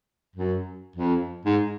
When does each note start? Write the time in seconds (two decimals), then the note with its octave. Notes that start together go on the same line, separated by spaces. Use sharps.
0.36 F#2
0.96 F2
1.45 G#2